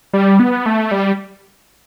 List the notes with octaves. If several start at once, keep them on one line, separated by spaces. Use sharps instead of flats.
G3
B3
A3
G3